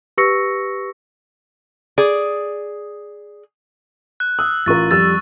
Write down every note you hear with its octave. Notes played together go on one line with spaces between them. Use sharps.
G4 B4 C#6 E6 A#6 C#7
G#4 D5
F#6
D#6 E6
A1 F4 A#4 C#6 A6
F2 G3 E6 A6